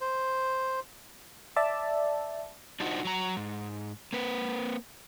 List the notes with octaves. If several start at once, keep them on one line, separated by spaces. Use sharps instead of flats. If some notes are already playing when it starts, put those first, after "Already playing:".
C5
D5 E5 A5
D4 D#4 F4 F#4 C5 D#5
F#3 A#5
G#2
A#3 C4 B4